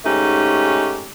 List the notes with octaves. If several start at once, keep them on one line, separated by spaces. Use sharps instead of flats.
G#2 A3 C#4 D#4 G4